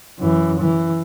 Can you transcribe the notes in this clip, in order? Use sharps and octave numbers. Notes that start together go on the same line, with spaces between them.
F#2 E3
E3